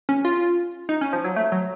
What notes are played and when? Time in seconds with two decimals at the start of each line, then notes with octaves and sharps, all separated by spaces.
0.09 C#4
0.25 F4
0.89 D#4
1.01 C#4
1.13 F3
1.24 F#3
1.36 A3
1.52 F#3